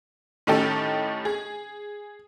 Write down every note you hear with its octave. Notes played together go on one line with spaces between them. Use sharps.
A2 D#3 C#4 D#4 G4 A4
G#4